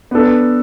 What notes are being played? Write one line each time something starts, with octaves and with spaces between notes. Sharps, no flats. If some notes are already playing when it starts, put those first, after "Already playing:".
B3 D4 A4